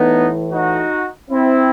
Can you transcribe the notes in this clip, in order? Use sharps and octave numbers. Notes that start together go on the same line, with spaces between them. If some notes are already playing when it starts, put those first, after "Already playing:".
Already playing: A2 E3 B3 D#4
D#4 F#4
C4 E4